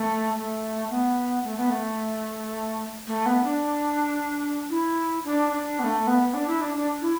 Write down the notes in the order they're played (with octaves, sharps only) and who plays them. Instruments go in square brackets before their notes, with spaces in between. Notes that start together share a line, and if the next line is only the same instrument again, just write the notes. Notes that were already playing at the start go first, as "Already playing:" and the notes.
Already playing: [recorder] A3
A3
B3
A3
B3
A3
A3
B3
D4
E4
D4
D4
B3
A3
B3
D4
E4
D4
D4
E4